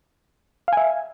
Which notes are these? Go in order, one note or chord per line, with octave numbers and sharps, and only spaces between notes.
E5 F5 G#5